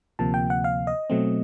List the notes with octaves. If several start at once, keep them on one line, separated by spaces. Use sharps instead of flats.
D2 C3 F3 A#3 A5
G5
F#5
F5
D#5
B2 F#3 A3 C4